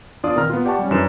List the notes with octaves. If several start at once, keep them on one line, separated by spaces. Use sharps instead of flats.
E2 D4 F4 D5 D#6
A#2 D#3 C4 A#5 F6
B3 F4
G4 D5 F#5 G5 A5 C#6
G3 C#4
F#2 E3 D4 B4 E7